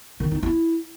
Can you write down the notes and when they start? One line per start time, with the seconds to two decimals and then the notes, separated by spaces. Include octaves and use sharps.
0.20 D#3
0.31 D#4
0.43 E4